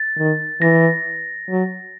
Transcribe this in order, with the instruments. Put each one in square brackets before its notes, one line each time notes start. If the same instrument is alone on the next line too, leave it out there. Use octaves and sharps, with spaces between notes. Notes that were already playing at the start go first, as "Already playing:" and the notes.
Already playing: [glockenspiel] A6
[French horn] D#3
[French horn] E3 [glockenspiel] A#6
[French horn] F#3